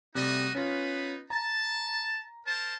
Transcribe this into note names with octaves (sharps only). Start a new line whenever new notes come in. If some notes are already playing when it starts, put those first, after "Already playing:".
C3 G3 A3 D#4 F#4 D#5
B3 C#4 D#4 F4 B4
A5 A#5
A#4 C5 A5